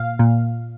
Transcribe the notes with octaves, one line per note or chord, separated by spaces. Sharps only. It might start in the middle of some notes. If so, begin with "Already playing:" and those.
Already playing: A#2 F5
A#2